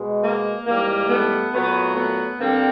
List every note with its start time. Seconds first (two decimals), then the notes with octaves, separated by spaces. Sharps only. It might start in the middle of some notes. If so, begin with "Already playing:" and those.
Already playing: B2 G#3
0.23 A#3
0.66 G#2 E3 G3 A#3
1.09 A3 B3
1.52 A#2 F#3 A3 B3
1.95 A3 B3
2.38 G2 D3 G3 A#3 C4